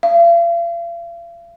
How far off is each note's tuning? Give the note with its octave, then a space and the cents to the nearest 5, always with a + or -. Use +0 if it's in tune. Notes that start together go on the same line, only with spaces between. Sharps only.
F5 -45